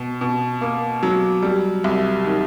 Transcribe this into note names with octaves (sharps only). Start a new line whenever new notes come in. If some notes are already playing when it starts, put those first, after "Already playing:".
Already playing: B2
B2
A#3
F#3
G3
C2
D#3